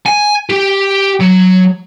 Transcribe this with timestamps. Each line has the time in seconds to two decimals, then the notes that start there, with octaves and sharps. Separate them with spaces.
0.06 G#5
0.50 G4
1.21 F#3